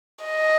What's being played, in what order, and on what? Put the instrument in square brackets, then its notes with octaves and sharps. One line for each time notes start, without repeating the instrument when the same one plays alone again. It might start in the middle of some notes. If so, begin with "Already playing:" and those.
[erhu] D#5